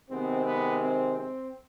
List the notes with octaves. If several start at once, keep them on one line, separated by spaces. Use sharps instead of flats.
C3 D#3 G#3 B3 C4
B3
C4
C4